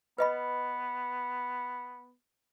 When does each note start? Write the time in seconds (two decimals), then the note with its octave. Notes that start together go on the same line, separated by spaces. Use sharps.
0.18 B3 B4 D#5 B5